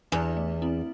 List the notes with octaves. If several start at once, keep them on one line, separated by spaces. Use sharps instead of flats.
E2 E4 B4 D5
A3
C4 E4